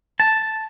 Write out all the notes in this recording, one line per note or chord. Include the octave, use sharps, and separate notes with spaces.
A5